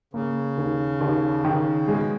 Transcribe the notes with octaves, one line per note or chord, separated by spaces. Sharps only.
C#3 A#3
D#2
D#2
D#3
B2 G#3